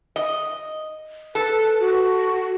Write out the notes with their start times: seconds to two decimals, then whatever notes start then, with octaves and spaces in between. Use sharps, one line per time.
0.16 D#5
1.35 A4 B4
1.80 F#4